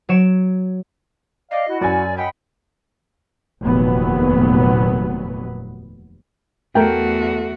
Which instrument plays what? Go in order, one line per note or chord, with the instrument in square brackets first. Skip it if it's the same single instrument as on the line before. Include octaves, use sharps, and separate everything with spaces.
[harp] F#3 C#5 D7 E7
[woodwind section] D5 F5 [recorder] D#5
[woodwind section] E4 F#4
[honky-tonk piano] F#2 G#5 [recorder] D5
[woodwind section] D#5 F#5 B5 [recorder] G5
[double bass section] F1 D#2 A#2 F#3 B3
[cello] E2 F#4 [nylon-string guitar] A3 [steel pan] A#4 G5